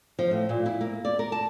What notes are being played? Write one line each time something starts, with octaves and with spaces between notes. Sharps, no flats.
F3
A2
A#2
E4
A#3
D5
A#4
A5